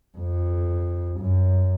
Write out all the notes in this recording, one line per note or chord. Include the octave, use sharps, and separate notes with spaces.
F2
F#2